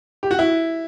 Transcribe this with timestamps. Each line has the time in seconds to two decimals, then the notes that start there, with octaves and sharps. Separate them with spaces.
0.23 G4
0.31 F#4
0.39 E4